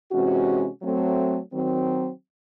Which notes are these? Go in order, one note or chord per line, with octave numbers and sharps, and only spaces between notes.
C3 E3 G#3 C#4 F#4
F#3 A3 C4
D#3 F#3 C4